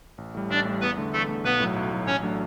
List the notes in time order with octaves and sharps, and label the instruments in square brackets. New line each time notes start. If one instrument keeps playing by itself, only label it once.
[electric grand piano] A1
A2 G3
[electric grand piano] A1 [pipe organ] D4 D5
[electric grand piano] A2 G3
[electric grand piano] E2 [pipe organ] B3 B4
[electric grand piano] D3 A3
[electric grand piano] E2 [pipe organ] A3 A4
[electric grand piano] D3 A3
[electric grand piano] B1 [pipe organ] B3 B4
[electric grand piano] A2 F#3
B1
A2 F#3
[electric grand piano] A1 [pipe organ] C#4 C#5
[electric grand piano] F#3 A3 D4